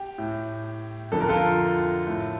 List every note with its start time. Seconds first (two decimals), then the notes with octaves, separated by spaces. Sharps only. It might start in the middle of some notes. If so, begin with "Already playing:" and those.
Already playing: G4
0.18 A2
1.12 F2 D3 A4
1.20 A#4
1.29 F4 A4
2.06 A2